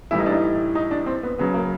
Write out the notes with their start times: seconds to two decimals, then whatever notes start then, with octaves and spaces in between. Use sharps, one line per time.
0.11 A2 E3 G3 E4
0.19 D#4
0.26 D4
0.32 D#4
0.75 D#4
0.91 D4
1.06 C4
1.23 B3
1.38 C#3 F#3 B3
1.54 A#3